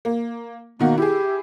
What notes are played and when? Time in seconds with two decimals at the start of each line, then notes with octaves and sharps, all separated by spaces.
0.05 A#3
0.79 B2 D#3 A#3 F#4
0.97 E4 G4 G#4